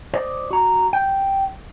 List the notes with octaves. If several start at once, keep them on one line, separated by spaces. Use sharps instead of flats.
C5 D5 D#5
F#4 A#5
G5